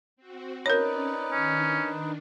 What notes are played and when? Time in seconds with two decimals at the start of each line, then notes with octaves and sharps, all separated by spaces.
0.16 C4 F#4
0.66 C#4 D#4 A#4 B4 C#5 D5
1.32 D#3 C#4 D4